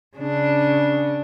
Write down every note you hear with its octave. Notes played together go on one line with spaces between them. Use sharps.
C#3 D4